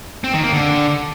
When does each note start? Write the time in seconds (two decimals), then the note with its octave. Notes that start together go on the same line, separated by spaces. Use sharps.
0.24 C4
0.34 D#3
0.43 A#3
0.53 D3